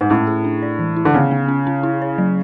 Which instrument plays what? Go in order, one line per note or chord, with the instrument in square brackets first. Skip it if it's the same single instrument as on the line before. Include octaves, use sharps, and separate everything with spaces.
[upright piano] G#2
[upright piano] A2 [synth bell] C#4
[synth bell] G#4
D4
D5
E3
E4
[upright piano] D3
[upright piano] C#3 [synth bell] B3
[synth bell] B3
C#4
C#4
E4
C#5
F#3